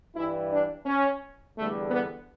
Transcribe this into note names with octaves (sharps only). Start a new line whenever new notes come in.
G2 E3 G3 E4
D4
C#4
E2 D3 G3 A3
B3